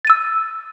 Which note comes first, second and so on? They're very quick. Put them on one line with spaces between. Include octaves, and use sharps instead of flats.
A6 D#7 E6